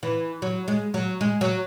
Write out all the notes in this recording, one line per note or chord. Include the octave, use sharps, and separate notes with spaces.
E3
F#3
G#3
F#3
G#3
F#3